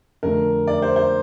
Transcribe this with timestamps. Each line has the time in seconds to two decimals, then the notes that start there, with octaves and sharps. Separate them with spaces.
0.23 F2 D3 A3 A#4
0.67 D5
0.82 C5
0.96 C5